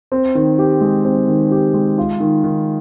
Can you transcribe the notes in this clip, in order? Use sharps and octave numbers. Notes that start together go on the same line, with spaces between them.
C4
D#3
G4
G#3
C4
D#3
G4
G#3
F4
D#3
D#3